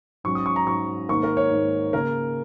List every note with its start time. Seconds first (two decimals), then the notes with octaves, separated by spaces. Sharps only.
0.24 G#2 F#3 C#4 C#6
0.35 D#6
0.46 C#6
0.56 A#5
0.67 G#2 F#3 C#4 C#6
1.09 G#2 D#3 A#3 C#6
1.23 A#4
1.37 C#5
1.51 G#2 D#3 A#3
1.93 C#3 A#3 A#4